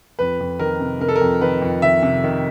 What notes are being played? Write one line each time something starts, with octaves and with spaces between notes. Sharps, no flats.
F2 B4
F2
D#3 A#4
C3
C3 A#4
A4
A#4
F2
D#3 B4
F2
D#3 E5
C3
D#3